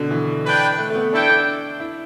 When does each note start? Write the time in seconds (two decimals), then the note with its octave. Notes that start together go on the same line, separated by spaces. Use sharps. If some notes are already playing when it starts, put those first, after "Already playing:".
Already playing: B2 D3
0.11 E3
0.45 D4 B4 G5
0.78 A3
0.90 A3
0.95 B3
1.12 D4 E4 A4 G5
1.30 D4
1.80 E4